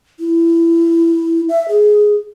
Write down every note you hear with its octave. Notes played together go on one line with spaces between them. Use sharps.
E4
E5
G#4